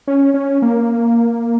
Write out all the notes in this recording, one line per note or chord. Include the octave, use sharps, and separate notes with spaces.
C#4
C#4
A#3